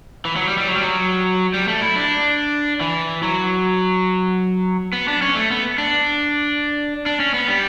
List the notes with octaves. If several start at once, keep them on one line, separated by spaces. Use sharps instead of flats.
E3
F#3
G3
G3
F#3
G3
F#3
G3
A3
E4
D4
E3
F#3
B3
D4
C#4
A3
B3
D4
D4
C#4
B3
G3